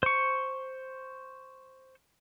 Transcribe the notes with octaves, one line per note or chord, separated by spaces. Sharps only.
C5 C#6